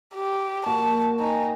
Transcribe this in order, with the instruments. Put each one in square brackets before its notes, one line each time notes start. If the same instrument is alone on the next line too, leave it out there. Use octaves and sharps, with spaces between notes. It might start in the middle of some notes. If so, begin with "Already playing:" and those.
[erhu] G4
[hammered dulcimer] A#2 F#4 [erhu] A5
[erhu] D#4 [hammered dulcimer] G5 G#5